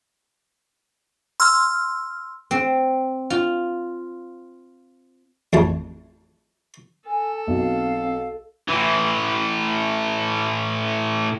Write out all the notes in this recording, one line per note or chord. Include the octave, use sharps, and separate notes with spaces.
C6 E6 F6
C4
F4
A1 F2 A5
A4 G#5
B1 C4 F5
A2 E3